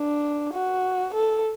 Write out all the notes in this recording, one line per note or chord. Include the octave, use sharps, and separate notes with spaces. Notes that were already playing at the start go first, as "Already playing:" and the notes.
Already playing: D4
F#4
A4